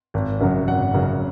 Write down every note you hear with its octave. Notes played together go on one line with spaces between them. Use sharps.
G#1
F#2 C#3 F#3
G#1 F#5
F#2 C#3 F#3